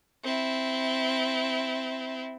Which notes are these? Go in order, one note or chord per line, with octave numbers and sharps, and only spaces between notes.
C4 E4